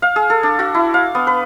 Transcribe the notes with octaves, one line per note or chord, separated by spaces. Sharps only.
F5
G#4
A4
D4
F#4
E4
F5
B3
B4